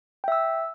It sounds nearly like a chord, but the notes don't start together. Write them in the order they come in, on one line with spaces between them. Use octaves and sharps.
G5 E5 E6